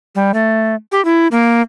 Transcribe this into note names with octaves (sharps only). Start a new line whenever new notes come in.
G3
A3
G4
E4
A#3